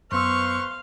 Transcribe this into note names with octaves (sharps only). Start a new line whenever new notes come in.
F#2 B3 B4 C5 F5 C6 C#6 E6